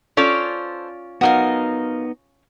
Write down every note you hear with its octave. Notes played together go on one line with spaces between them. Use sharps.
C#4 F4 A4 C5 D5
B3 D#4 F#4 A#4 F5